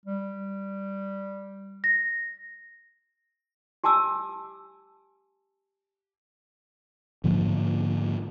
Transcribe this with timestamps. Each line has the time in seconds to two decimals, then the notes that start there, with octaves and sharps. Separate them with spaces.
0.06 G3
1.84 A#6
3.84 G4 G#5 A5 D6 E6
7.24 G#2 D3 F3 A#3